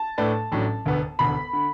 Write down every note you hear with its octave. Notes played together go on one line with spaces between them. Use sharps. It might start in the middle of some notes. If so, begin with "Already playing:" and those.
Already playing: A5
A2 A3 D4 B4 D5
A1 A2 F#3 D4
E1 D2 D3 B3
E1 D2 D3 B5
D3